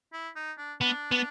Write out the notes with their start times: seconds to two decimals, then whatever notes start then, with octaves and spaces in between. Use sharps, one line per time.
0.13 E4
0.36 D#4
0.58 D4
0.81 B3 D4
1.11 B3